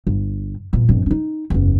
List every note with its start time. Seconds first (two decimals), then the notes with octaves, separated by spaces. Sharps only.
0.07 G1
0.73 E2 A#2
0.89 G1 F2
1.06 C#4 D#4
1.50 F#1 E2